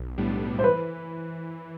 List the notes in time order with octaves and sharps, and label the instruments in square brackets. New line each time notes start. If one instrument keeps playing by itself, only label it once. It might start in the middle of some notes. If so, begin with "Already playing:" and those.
Already playing: [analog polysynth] B1
A2 G3 B3 D4
[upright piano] C5
[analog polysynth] E3 [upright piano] B4